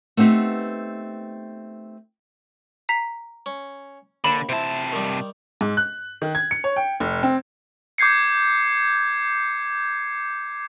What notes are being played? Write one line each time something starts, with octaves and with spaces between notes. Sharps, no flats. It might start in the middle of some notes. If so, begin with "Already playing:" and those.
A3 B3 C4 D#4 G4
A#5 B6 C7
C#4
D#2 D3 B5 E7
C3 C4 E4 A5
D#3 G3
G#2
F#6
D#3
G#6
C#7
C#5
G5
F1
C4
D6 G6 G#6 C7 C#7